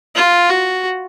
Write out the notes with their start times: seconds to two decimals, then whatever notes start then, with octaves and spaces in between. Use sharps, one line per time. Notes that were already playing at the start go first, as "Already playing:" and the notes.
0.15 F4
0.49 F#4